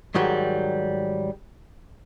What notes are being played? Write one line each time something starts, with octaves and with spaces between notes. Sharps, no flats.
G#2 D#3 F#3 G3